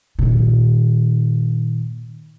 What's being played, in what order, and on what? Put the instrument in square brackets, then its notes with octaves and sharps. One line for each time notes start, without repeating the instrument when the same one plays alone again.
[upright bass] A#2 D#3